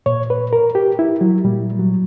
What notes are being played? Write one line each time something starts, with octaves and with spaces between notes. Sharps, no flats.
A#2 C#5
B4
A#4
G4
E4
F#3
A#2 G3
F#3